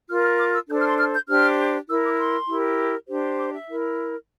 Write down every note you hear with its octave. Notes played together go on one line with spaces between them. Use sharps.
F4 A#4 F6
F6
D6
E6
D4 A4 C5 G6
F6
C6
F6
G6
D4 G4 C5 F6
E4 A#4 E6
D6
C6
E4 G4 A#4
D4 G4 C5
D6
E5
E4 A#4